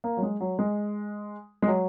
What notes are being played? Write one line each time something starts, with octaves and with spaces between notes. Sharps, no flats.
A#3
F#3
G#3
F#3
G#3
G#3
F#3